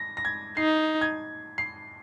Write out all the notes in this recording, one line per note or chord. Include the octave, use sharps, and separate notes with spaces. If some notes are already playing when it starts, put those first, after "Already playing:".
Already playing: A#6
A#6
G#6
D#4 C7
G#6
C7